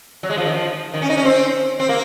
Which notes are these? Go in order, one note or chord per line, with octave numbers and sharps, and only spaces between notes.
F#3
G#3
F3
D#3
F3
D#3
C#4
D#4
C#4
C4
C4
A#3